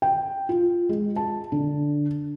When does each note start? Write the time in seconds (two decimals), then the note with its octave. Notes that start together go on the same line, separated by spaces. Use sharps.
0.02 G5
0.49 F4
0.89 G#3
1.16 A5
1.52 D3